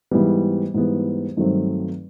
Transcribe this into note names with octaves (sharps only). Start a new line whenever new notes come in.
G#2 E3 G3 B3
G#2 E3 G3 B3
G2 D#3 F#3 A3 C4